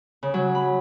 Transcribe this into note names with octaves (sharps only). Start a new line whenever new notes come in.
C#3
F#3
B5